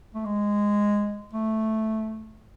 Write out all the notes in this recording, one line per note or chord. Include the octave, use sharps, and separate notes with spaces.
A3
G#3
A3